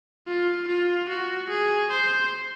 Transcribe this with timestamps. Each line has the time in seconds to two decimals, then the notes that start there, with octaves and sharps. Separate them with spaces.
0.27 F4
0.68 F4
1.08 F#4
1.49 G#4
1.91 C5